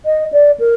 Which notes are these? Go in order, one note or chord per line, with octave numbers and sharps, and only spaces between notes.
D#5
D5
A#4